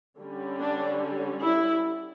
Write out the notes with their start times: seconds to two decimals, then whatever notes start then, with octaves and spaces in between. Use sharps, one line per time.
0.18 D3 G3 C#4
0.59 D4
1.44 E4